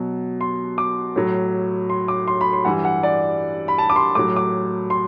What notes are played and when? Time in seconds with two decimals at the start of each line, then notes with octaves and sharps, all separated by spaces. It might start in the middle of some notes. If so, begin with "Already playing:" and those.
Already playing: B2 F#3
0.41 C6
0.78 D6
1.16 A2 F#3
1.90 C6
2.08 D6
2.28 C6
2.41 B5
2.53 C6
2.65 G2 E3 G3 F#5
2.85 F#5
3.03 D5
3.68 B5
3.78 A5
3.90 D6
3.96 C6
4.15 A2 F#3 D6
4.36 D6
4.90 C6